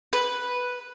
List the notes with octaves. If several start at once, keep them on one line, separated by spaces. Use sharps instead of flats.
B4